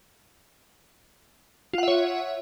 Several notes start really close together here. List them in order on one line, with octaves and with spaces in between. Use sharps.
F4 F#5 E5 C#5